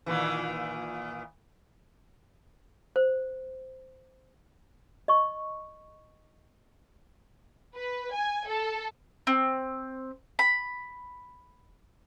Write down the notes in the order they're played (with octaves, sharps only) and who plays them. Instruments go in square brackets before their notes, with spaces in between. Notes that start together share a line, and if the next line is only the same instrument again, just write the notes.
[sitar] A#2 D#3 E3
[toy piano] C5
D#5 C#6
[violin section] B4
G#5
A4
[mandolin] C4
B5